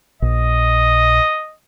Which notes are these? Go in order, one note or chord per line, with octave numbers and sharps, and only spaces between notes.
A#1 D#5